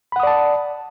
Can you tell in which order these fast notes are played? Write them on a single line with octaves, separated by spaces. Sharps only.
B5 F#5 D#6 D5 A5